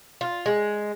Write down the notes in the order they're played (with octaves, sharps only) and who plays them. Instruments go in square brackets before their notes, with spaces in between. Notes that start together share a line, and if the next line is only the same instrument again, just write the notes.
[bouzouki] F4
G#3